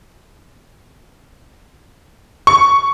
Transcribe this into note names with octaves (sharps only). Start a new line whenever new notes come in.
C#6